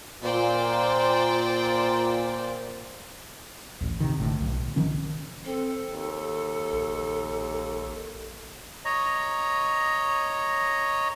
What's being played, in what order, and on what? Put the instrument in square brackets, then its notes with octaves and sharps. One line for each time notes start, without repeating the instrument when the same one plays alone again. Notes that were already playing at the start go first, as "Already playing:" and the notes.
[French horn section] A#2 [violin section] C5 D5 G5
[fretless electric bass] A1 D2
C3 D#3
G#1 A2 D3
B1
D#3 F3 C#4
[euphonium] C4 [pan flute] A4
[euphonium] D#2
[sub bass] A#1
[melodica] C#5 D#5 A#5